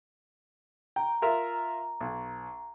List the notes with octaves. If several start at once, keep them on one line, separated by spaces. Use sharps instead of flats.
G5 A#5
F4 A#4 E5
B1